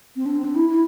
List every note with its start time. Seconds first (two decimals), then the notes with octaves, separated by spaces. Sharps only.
0.16 C4
0.26 D4
0.35 C4
0.44 D4
0.55 E4
0.68 E4